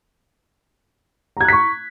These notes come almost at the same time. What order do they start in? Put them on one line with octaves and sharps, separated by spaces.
A#5 G#6 F#6 B6 C#6